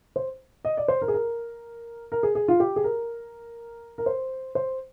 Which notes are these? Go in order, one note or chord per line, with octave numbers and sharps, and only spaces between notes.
C5
D#5
D5
C5
A#4
G#4
A#4
A#4
G#4
G#4
F4
G4
G#4
A#4
A#4
C5
C5